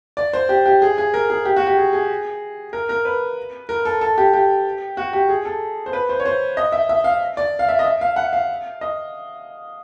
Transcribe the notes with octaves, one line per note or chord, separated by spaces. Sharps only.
D5
C5
G4
G4
G#4
G#4
A#4
G#4
G4
F#4
G4
G#4
G#4
A#4
A#4
B4
A#4
A4
A4
G4
G4
F#4
G4
G#4
A4
C5
B4
C5
C#5
C5
D#5
E5
E5
F5
D5
F5
E5
D#5
E5
F5
F#5
F5
D#5